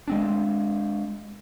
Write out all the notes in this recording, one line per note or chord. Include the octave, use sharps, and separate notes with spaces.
G#3 C4 D4